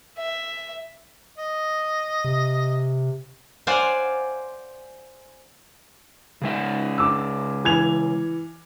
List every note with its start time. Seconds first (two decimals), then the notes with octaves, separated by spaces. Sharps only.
0.17 E5
1.38 D#5
2.24 C3
3.67 C5 D5 F5 F#5 G#5
6.42 C#3 G#3 E5
6.98 D6 E6
7.65 E3 G#6 F7